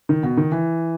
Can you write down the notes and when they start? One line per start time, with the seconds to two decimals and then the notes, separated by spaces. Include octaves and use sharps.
0.09 D#3
0.23 B2
0.37 D#3
0.52 E3